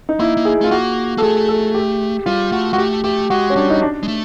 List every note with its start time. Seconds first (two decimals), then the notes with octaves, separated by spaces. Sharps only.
0.09 D#4
0.19 A#3 E4
0.37 A#3
0.45 G#4
0.61 A3 F4
0.71 A#3 F#4
1.17 A#3 A4
1.22 A3 G#4
1.48 A4
1.74 G4
2.26 G3 F4
2.52 A3 F#4
2.73 G#3 F#4
2.78 A3 G4
3.04 A3 G4
3.30 G#3 F#4
3.50 C#4
3.56 G3 D4
3.70 D#4
3.82 D4
4.03 G#3
4.08 A3